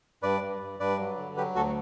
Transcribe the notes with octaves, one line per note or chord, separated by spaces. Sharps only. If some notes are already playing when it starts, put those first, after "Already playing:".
G2 B4 D5
G2
G2
G2 B4 D5
F#3
D3
F#3 G4 B4
D2 F#4 A4